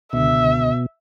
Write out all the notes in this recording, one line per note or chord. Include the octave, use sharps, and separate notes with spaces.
C#2 B2 D3 E5